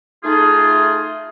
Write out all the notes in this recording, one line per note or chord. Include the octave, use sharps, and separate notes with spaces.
A3 D#4 F4 G#4